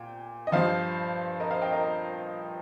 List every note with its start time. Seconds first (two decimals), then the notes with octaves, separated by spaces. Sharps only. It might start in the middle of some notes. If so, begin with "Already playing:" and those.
Already playing: A#2 G5
0.47 D#5
0.52 G2 F3 C5 F5
1.40 A#4 D#5
1.50 C5 F5
1.62 D#5 G5
1.72 A#4 D#5
1.83 A#4